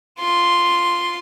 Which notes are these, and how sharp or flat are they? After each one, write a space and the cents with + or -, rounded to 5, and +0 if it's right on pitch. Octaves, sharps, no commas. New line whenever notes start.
F4 +0 C6 +0